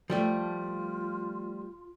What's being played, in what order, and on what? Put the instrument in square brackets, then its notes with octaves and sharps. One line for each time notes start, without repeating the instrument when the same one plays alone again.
[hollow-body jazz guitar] F3 G3 A3 [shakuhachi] F4